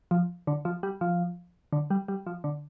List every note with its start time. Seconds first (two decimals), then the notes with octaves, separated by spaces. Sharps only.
0.11 F3
0.47 D3
0.65 F3
0.83 G3
1.01 F3
1.73 D3
1.90 G3
2.08 G3
2.27 F3
2.44 D3